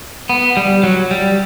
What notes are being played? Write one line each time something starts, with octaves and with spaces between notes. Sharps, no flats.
B3
G3
F#3
G3